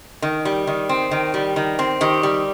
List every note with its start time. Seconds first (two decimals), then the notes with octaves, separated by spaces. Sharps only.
0.22 D#3
0.45 G3
0.67 D#3
0.89 C4
1.11 D#3
1.34 G3
1.56 D#3
1.79 C4
2.01 D#3 G4
2.23 G3